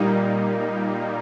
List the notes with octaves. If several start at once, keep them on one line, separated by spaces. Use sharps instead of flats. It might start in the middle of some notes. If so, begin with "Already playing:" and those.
Already playing: A#2 G3 A#3 D#4